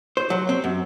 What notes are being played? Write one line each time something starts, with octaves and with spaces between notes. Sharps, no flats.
C5
F#3
C4
F#2